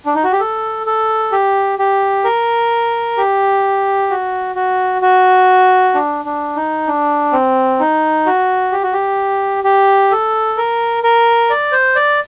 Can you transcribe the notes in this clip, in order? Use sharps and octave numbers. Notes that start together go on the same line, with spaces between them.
D4
D#4
F#4
G4
A4
A4
G4
G4
A#4
G4
F#4
F#4
F#4
D4
D4
D#4
D4
C4
D#4
F#4
G4
F#4
G4
G4
A4
A#4
A#4
D5
C5
D5